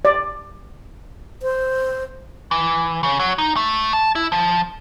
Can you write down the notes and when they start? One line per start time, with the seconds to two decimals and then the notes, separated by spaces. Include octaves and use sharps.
0.05 D5
1.42 C5
2.51 E3
3.03 C#3
3.19 F#3
3.38 D#4
3.56 A3
3.93 A5
4.15 E4
4.32 F3